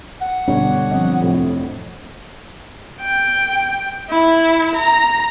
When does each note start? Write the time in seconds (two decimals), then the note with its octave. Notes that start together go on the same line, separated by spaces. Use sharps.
0.21 F#5
0.48 G2 B2 D3 D4 C#5
0.91 F3 C4 D#5
1.21 F2 A2 C3
3.00 G5
4.09 E4
4.75 A#5